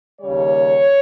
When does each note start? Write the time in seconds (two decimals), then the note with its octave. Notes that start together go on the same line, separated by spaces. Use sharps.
0.21 D#2 C#3 G3 C#5